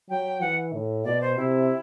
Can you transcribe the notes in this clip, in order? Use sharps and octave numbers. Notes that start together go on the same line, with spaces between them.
F#3 G5
E3 F#5
A2
B2 D5
C5
C3 E4